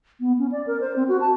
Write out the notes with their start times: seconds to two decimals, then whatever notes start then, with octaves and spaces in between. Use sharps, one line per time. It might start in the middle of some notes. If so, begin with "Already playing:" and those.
0.20 B3
0.39 C#4
0.52 D5
0.67 A#4
0.81 C5
0.96 C4
1.08 F#4
1.21 A5